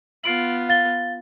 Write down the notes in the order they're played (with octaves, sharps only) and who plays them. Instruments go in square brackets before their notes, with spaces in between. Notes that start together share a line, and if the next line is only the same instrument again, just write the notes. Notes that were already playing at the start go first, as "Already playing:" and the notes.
[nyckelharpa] B3 F4 [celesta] C7 D7 F#7
[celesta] F5 A6 G7